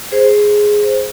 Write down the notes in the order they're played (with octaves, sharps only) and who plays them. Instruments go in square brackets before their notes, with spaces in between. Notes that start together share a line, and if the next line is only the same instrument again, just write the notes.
[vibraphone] G#4 C5